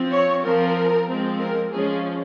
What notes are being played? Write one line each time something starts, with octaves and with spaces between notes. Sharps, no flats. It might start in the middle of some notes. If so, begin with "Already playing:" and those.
Already playing: F3 C4
C#5
F3 C4 A#4
F3 G#3 C4
A#4
F3 G#3 C#4 G#4